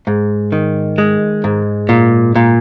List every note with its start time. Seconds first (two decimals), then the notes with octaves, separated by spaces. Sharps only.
0.07 G#2
0.52 D#3
0.98 G#3
1.44 G#2
1.89 A#2
2.36 A#2